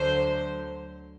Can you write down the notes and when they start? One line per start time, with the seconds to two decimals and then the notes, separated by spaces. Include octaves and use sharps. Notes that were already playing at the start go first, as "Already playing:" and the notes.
Already playing: D2 D3 F#3 C5